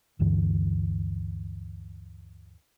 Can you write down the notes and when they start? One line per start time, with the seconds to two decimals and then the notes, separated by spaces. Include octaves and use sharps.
0.19 D2 G2 D3 E3